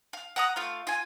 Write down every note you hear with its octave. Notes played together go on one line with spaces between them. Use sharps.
F5
F#5 A#5 D#6
A3 F4 F5
F4 G#5